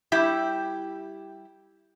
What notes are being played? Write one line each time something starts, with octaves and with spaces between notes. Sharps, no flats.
G3 E4 G4